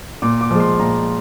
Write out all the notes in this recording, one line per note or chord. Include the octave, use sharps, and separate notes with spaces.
A#2 D6
D6
F3 G#3
C6
A#2 A#5